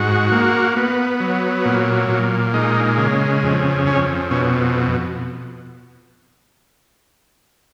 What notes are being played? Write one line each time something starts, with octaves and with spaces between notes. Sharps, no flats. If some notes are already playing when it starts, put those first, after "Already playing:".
Already playing: G#2 F#4
A#3
B3
F#3
A#2
A#2
G#3 D#4
C#3
F2
F2 C#4
B2 C#4